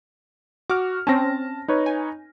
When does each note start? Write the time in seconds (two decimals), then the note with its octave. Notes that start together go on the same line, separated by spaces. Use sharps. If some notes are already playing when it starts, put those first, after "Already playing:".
0.70 F#4 D6 F6
1.07 C4 C#4 A5 A#6
1.68 D#4 B4 C#5
1.86 G#5